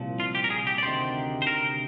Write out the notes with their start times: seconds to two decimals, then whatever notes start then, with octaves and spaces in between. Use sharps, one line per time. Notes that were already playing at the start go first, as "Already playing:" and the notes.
Already playing: C2 A#2 F3
0.20 F4
0.35 G4
0.44 A#4
0.50 G#4
0.67 G4
0.78 D5
0.83 D2 C3 D#3 C5
1.42 C5
1.47 A#4